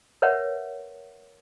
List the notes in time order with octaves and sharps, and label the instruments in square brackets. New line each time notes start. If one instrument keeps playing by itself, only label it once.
[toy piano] A#4 B4 C#5 E5 F#5